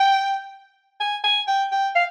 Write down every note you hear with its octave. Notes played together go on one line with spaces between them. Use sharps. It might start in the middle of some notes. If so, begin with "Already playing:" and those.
Already playing: G5
G#5
G#5
G5
G5
F5